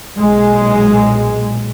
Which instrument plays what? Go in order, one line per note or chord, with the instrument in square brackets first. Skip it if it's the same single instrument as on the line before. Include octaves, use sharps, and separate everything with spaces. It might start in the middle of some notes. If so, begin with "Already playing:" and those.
[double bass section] B1 A#2 G#3